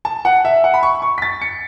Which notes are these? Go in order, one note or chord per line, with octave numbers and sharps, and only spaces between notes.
A5
F#5
E5
F#5
B5
C#6
C#6
B6
A6
C#7